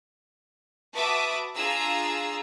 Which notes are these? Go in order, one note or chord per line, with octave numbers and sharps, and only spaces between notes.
F#4 B4 E5 A5 D6 D#6
D4 F4 G#4 A#5 E6